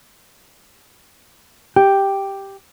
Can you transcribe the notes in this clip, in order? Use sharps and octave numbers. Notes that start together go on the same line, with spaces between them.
G4